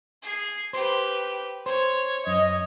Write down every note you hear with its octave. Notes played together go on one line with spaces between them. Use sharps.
G#4 C7
G4 B4 C5
C5 C#5
F#2 D#5